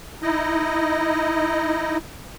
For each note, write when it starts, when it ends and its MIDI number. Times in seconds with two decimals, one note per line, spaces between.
0.22 1.97 63
0.22 1.97 64
0.22 1.97 75